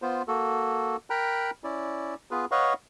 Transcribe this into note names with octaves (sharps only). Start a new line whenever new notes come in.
B3 F4 C5
A#3 F#4 A4
A#4 G5 A#5 B5 F#6
C#4 E4 D5
B3 F4 G#4 B4
B4 C#5 D#5 F5 F#5 C#6